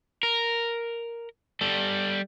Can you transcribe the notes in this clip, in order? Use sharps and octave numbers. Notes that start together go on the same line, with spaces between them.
A#4
G3 A4